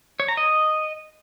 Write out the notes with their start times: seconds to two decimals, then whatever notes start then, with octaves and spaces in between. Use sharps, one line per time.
0.20 C#5
0.28 A#5
0.37 D#5